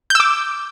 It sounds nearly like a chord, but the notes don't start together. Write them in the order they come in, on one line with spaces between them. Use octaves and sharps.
G6 E6 D6